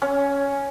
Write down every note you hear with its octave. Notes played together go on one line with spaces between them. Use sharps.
C#4